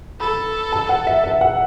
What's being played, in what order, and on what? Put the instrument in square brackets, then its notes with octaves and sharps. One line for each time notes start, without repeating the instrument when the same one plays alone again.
[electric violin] A4 [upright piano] B5
[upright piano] A5
F#5
E5
E5
F#5